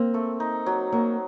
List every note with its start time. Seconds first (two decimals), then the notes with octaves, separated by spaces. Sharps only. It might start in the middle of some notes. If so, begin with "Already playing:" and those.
Already playing: A#3 C4
0.14 A3
0.40 D#4
0.66 F#3
0.92 F#3 A#3